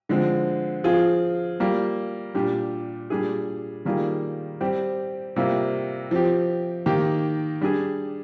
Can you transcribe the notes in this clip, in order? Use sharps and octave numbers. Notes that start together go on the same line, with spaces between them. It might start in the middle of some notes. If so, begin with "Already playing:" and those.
D3 F3 G#3 C4
F3 C4 F4 G#4
G3 A#3 F4
A#2 G3 D4 G4
A#2 G3 D4 G#4
D#3 G3 A#3 F4 G#4
G3 C4 G4
C3 G3 A#3 F4
F3 C4 G4
D#3 A#3 D#4 G4
G3 D4 G#4